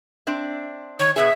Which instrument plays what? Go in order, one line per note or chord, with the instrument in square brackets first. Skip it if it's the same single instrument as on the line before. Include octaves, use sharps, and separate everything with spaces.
[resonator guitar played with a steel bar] C4 D4 E5
[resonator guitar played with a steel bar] D#3 [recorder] C#5
[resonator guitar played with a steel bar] B2 B3 G#4 [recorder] E5